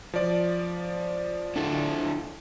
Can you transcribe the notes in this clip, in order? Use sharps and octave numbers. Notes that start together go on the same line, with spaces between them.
F3 D5
D4 E4 A4